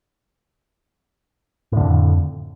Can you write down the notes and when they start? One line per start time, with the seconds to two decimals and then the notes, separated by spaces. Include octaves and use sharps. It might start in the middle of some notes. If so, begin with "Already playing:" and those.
1.72 A2
1.76 D3
1.81 F2